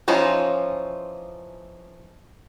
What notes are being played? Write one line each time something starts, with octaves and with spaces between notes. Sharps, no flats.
E3 F3 C#4 D#4 F4